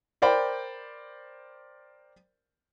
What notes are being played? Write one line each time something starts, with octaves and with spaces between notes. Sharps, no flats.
A#4 C5 D5 G5 B5